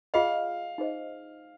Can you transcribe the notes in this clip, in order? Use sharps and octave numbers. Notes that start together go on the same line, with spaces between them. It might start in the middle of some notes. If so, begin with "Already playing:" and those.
F4 G#4 D#5 F5 F#5
D#4 G#4 C5 D#5